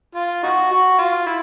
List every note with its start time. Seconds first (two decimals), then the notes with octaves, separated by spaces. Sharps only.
0.15 F4
0.43 D#4 F#4
0.71 F#4
0.98 F4
1.26 E4